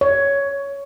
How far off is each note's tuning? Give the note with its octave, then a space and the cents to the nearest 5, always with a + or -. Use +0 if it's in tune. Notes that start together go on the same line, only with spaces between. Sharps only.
C#5 +10